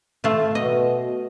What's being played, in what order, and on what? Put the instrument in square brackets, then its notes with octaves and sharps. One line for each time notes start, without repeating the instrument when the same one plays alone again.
[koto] A3 F4
[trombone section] B2 [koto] D#5